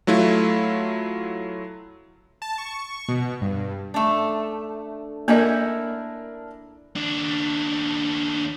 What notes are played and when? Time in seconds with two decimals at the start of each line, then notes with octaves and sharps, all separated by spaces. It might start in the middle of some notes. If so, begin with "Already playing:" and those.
0.07 F#3 A3 E4 F4
2.42 A5
2.58 C#6
3.09 B2
3.41 G2
3.94 A3 D4
5.28 A#3 D4 E4 A#4 D#5 F#5 G#5
6.96 D#2 D4